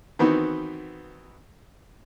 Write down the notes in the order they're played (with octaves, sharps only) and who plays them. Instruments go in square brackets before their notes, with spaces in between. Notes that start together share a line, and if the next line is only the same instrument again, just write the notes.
[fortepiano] D#3 E3 B3 C4 D#4 F#4